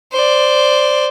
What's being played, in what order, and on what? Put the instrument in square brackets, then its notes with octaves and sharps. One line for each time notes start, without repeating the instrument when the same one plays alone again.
[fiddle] C5 D5